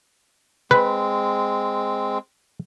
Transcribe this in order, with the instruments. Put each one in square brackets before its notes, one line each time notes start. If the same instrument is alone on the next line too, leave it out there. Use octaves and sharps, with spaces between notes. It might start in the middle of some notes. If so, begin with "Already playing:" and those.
[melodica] G#3 C4 [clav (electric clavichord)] B4